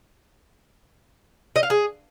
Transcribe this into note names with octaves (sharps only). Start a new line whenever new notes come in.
D#5
F5
G#4